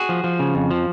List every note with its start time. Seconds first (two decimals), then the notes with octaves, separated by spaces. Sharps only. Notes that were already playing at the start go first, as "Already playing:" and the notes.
Already playing: F#4 G#4
0.09 F3
0.24 F3
0.39 C#3
0.55 F2
0.71 F3